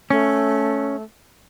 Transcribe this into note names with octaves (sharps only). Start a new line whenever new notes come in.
A3 C#4